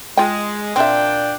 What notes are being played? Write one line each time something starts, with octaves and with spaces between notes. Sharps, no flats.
G#3 F4 G5
A#2 C4 D4 E5 G5